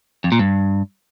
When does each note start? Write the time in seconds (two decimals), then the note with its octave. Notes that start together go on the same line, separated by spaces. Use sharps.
0.24 F2
0.32 A#2
0.39 G2